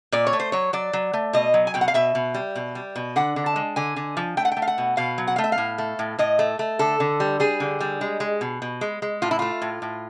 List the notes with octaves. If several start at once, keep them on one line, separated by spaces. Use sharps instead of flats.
A#2 D5
C#5
A3
C5
F#3 C#5
F#3 D5
F#3
A3
B2 D#5
F#3
G#5
B2 G5
F#5
F5
B2 E5
B2
G3
B2
G3
B2
D3 F#5
D3
A5
G#3
D3 G#5
D3
F3
A3 G5
F#5
G5
A3
F5
F#5
B2
B2 F5
F#3
F#5
A3 F5
E5
F5
A2
A3
A2
A2 D#5
A3
A3
D3 A4
D3
G3
G3 G#4
D3
G3
G#3
G#3
B2
B2
G#3
G#3
A2 F4
E4
A3 F4
A2
A2